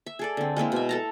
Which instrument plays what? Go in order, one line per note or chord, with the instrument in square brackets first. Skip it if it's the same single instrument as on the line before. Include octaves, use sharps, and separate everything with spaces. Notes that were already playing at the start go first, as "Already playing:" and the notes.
[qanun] E5
G#4 A4 D5
D3 C4
G#3 A#3 C4 E4
B2 E5
A4 A5 A#5